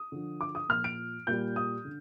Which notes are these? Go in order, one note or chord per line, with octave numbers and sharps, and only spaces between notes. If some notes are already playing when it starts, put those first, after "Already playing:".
Already playing: D#6
D3 F3
D6
D#6
A#2 F3 F6
D7
A#2 G3 G6
D#6
D3